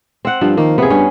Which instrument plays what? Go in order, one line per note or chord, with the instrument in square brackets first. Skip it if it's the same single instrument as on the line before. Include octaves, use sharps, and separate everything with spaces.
[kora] C4 F#5
[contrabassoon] G2 [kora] F3
[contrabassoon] D#3 [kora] A#3
[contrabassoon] C3 [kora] B3 G#4
[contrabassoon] G2 [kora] C#4